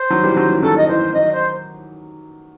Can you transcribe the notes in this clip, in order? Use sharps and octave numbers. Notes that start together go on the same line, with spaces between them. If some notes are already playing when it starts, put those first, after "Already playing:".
Already playing: C5
D#3 F#3
E3 G3
D#3 F#3
E3
D#3 F#3 A4
D#5
E3 C5
D#3 F#3 D#5
C5